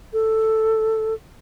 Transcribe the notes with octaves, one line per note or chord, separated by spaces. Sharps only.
A4